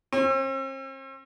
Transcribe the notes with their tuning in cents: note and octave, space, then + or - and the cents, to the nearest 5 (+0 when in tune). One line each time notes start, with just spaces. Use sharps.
C4 +45